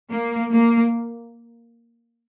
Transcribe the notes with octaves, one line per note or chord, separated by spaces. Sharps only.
A#3
A#3